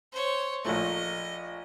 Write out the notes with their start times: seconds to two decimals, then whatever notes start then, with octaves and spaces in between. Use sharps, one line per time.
0.12 C5 C#5
0.65 A#1 A#2 A3 D#5